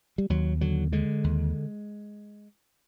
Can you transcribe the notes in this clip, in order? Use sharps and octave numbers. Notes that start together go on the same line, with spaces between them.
G3
D#2 F#3
D3 F#3
D3 G#3
D#2